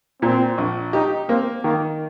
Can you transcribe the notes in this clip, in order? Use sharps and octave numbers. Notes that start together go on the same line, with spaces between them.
A#2 C4
A#1
D#4 G4
A#3 C4
D#3 A#3